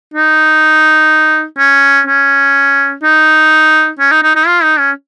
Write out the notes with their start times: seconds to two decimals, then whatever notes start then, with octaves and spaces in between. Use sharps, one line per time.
0.14 D#4
1.58 C#4
2.07 C#4
3.03 D#4
3.99 C#4
4.11 D#4
4.23 D#4
4.35 D#4
4.47 F4
4.63 D#4
4.79 C#4